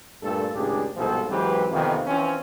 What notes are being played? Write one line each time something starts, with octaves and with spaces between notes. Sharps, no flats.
G2 A#2 A3 A4
G#1 C#2 A2 D4 G4 G#4
C2 G#2 B2 F3 C4 A4
G#2 E3 F#3 C4 G4 B4
F2 C3 D#3 E3 A#3 B3
E3 F3 C4 C#4